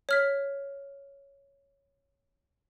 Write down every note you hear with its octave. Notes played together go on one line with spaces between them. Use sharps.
C#5 F6 B6